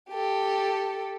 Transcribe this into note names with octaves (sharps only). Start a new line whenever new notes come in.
G4 A4